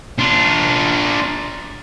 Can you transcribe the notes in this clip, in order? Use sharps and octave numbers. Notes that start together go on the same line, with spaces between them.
D4 F4